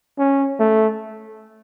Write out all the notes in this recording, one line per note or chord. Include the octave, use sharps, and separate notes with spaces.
C#4
A3